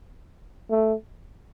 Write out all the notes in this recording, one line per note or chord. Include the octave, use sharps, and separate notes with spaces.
A3